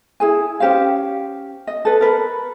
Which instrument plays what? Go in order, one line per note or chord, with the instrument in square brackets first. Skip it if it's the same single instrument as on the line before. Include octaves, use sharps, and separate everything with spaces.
[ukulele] E4 G#4 G#5
C#4 G4 C5 F5
D#5
A4 B4
A#4 B4